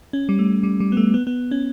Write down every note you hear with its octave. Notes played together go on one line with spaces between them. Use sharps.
C#4
G3
A3
G3
G3
B3
A3
B3
B3
C#4